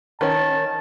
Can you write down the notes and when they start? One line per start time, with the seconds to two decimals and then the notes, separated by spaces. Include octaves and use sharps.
0.21 D#3 C#4 A5